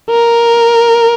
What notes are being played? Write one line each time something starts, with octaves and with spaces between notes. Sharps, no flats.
A#4